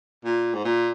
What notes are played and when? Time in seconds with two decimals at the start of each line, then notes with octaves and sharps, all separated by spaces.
0.24 A#2
0.54 G#2
0.64 A#2